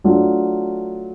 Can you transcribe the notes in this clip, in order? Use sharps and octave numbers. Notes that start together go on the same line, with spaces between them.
F#3 A3 D4 F4